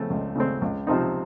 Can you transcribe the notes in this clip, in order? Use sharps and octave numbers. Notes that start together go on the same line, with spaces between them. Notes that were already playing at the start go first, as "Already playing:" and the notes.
Already playing: C#3 A3 C4
C#2
C#3 A3 C4
C#2
C3 F3 C4 D#4